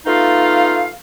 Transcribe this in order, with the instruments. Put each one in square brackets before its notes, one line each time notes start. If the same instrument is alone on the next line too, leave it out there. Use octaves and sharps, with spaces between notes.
[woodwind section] A3 B3 D#4 F4 F5